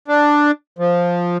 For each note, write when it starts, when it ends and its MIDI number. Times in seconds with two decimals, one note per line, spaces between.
0.08 0.51 62
0.79 1.37 53